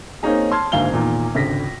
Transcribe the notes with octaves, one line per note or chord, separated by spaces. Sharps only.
A#3 C4 C#4 D#4 G#4
A5 C6 F6 G#6
D2 G#2 A#3 F5 G#5 G7
E2 A#2 D#3
G#1 C#2 D3 A#6 B6